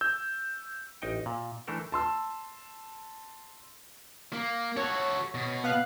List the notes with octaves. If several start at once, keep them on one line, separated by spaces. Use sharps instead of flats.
E6 G6
A1 D#4 G5
A#2
E3 A3 D4 A4 A#4
A5 C6 E6
A#3
F#4 A4 C#5
B2
B3 F5 F#6